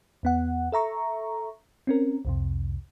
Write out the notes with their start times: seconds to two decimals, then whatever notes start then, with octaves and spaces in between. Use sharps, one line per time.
0.23 E2 B3 F#5
0.72 A4 E5 A#5 C#6
1.87 C4 C#4 A#4
2.25 C2 F2 C3